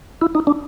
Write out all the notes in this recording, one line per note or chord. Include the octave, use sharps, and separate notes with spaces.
E4
D#4
D4